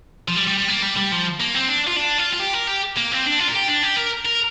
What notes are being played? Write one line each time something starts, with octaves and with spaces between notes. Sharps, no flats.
F3
G3
G3
G3
A#3
G3
G3
F3
A#3
C4
D4
F4
D4
F4
F4
G4
A#4
G4
A#3
C4
D4
F4
A#4
G4
D4
G4
A#4
A#4